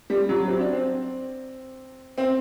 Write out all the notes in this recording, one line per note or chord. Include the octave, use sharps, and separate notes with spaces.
G3
F#3
C4
D4
C4
C4